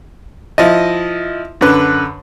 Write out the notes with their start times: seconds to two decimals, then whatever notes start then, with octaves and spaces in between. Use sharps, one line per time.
0.58 F3 E4 D#5
1.61 F#2 D3 B4